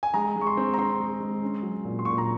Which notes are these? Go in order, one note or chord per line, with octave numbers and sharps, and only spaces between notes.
G#5
G#3 A#5
G#3
C#6
C6
C4
A#5
C4 C6
G#3
G#3
C#4
F#3
A#2
C6
A#2 C#6
A#5